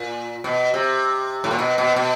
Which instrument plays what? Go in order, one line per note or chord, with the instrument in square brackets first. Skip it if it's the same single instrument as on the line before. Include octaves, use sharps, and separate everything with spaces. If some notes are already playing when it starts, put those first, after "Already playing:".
Already playing: [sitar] A#2
B2
C3
A2
A#2
B2
B2
B2